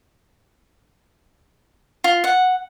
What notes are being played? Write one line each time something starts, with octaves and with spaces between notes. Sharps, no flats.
F4
F#5